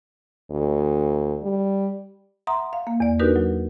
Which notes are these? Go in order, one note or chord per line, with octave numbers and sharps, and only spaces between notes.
D2
G3
E5 F#5 A#5 C6 D#6
F5
A#3
E2 D5
D4 D#4 F#4 G4 A#4 B4
F#3